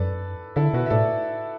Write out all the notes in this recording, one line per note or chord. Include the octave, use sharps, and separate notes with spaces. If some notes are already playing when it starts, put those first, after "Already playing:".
Already playing: F#2 A4 B4 D5
D3 E4 A4
B2 F#4 B4
E5
A2 A4 D5